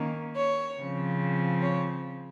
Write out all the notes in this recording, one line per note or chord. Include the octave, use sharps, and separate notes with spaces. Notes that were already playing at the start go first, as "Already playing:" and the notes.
Already playing: D#3 A#3 C#4
C#5
C#3 F3 C4
C#5